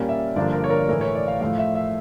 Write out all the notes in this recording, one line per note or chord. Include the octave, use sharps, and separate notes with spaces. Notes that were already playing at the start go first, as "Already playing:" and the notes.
Already playing: A#2 G3 A#3 C#4 D5
E5
G2 D3 F3 A#3 D4 D5
A#4
C#5
A#4
A2 E3 A3 A#4
C#5
D5
F5
A2 F3 A3 F5
E5
E5